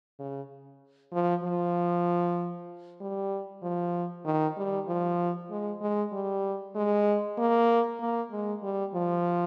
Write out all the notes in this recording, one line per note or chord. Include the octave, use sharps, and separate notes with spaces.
C#3
F3
F3
G3
F3
D#3
G3
F3
G#3
G#3
G3
G#3
A#3
A#3
G#3
G3
F3